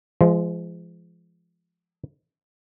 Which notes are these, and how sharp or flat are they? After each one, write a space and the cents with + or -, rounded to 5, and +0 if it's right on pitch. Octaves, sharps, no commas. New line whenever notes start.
F3 -30 G#3 +5